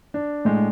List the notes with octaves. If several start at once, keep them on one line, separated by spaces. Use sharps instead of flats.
D4
A2 G#3